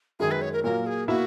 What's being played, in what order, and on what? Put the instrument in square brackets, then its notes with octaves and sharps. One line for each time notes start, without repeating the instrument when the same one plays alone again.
[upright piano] F#2 D#3 G#3 [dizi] G#4
[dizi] B4
C#5
A#4
[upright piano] A#2 F#3 A#3 [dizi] A#4
[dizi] G#4
[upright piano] B2 A#3 E4 [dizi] F#4